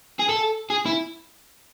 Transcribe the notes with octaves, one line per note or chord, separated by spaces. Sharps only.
G#4
A4
G#4
E4